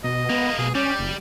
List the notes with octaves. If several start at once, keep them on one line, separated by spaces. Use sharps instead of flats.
B2 D#5
G#3 A#3 B3
B2 G#4
G3 C#4 G4
F#1